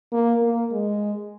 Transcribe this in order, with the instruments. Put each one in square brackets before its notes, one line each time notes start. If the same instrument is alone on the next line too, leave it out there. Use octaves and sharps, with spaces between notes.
[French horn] A#3
A#3
G#3